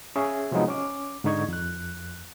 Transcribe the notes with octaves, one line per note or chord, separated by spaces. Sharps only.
C#4 G#4 E5 G#5
C3 F3 F#3 G#3 B3 D#4
C#4 D6
G#2 D3 D#4 C#6 G#6
F2 F#6